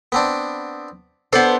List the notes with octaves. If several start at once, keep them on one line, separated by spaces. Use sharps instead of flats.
B3 C4 D4
B3 D4 A4 C5